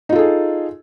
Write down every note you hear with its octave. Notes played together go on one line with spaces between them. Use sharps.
D#4 F4 G#4 A4